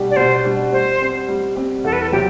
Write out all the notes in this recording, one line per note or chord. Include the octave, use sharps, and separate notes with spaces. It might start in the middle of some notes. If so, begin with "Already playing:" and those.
Already playing: B2 G3 D4 G4
D5
B2 C5
G3 D4 G4
G3 C5
C4 G4
G3
C4 G4
E2 A4
B4
A4
C3 F#3 G4